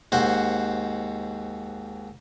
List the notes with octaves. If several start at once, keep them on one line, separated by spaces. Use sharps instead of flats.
D#2 G#2 F#4 C5 F#5